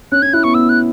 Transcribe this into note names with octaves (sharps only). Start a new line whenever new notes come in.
C#4 F#6
C#4 G#6
E4 F#6
B3 C#6
B3 E6
F#6